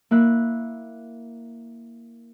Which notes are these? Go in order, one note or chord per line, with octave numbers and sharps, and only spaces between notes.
A#3 E4 F#6